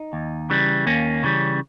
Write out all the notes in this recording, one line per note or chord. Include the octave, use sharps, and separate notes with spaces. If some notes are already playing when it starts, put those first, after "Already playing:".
Already playing: D#4
D#2
C#3 E3 G3
D#2 A#3 C#4
C#3 E3 G3